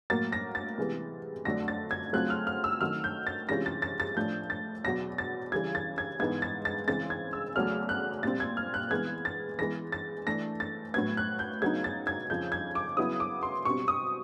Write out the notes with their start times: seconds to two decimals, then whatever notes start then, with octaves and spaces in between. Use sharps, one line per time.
0.10 A2 F#3 A#3 A6
0.32 A#6
0.55 A6
0.78 C3 E3 G#3 B3
1.45 F2 D3 F#3 A3 D4 A#6
1.68 A6
1.91 G#6
2.13 C#3 F#3 A3 C4 F4 F#6
2.30 F6
2.47 F6
2.64 E6
2.81 D#3 F#3 A3 F6
3.04 G6
3.27 A6
3.49 C3 E3 G#3 C#4 F4 A#6
3.66 A6
3.82 A6
4.00 A6
4.17 A2 F3 A3 D4 G6
4.50 A6
4.84 E2 B2 F#3 A#6
5.18 A6
5.52 C#3 E3 G3 G#6
5.75 A6
5.98 G#6
6.20 G#2 E3 G#3 B3 D#4 G#6
6.42 A6
6.65 A6
6.87 C#3 E3 G#3 C4 A6
7.10 G#6
7.33 E6
7.55 E2 C#3 F#3 A3 F6
7.89 F#6
8.23 A#2 G3 C4 A6
8.40 G#6
8.57 F6
8.74 F#6
8.91 E3 G#3 B3 G#6
9.25 A6
9.59 E3 G#3 B3 A#6
9.92 A6
10.27 E3 A3 D4 A#6
10.60 A6
10.94 A2 F#3 B3 G#6
11.17 F#6
11.39 G6
11.62 C#3 F#3 B3 D#4 G#6
11.84 A6
12.07 G#6
12.30 F2 C#3 F3 G6
12.52 G#6
12.75 D6
12.97 C#3 F#3 B3 E4 D#6
13.20 D6
13.43 C6
13.65 B2 G3 C4 C#6
13.88 D#6